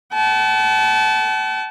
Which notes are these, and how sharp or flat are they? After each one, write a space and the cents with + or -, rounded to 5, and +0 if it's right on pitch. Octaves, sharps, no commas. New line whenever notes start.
F#5 +45 A5 -25